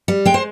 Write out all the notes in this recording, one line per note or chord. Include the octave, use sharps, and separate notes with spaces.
G3
G#3 G5
C5